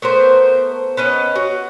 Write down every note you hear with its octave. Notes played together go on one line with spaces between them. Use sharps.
A3 B3 A#4 C5
B3 C#4 D#5
F#4